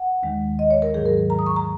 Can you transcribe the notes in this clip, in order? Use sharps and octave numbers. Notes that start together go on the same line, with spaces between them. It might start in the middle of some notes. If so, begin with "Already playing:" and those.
Already playing: F#5
D#2 D#3 G#3
D#5
C#5
A#4
G#2 D#3 F#3 G#4
A#4
A#4
A#5
D#6
C#6
A#5